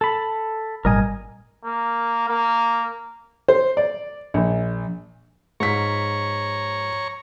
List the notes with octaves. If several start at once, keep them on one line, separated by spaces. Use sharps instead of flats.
A4 B5
G#1 A#2 G3 A#4 D#5 G#5
A#3
A#3
C5
D5
A#1
G#2 C#5 A#5 C#6 B6